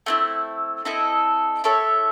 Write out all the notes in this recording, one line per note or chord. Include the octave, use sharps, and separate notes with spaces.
A3 C4 E4
C4 E4 A4 D#5
E4 A4 C#5 E5